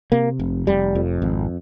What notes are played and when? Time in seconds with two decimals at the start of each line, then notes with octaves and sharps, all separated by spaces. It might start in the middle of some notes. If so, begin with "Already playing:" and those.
0.12 C3 A#3
0.39 F1
0.67 F1 G3
0.95 F2
1.22 G#1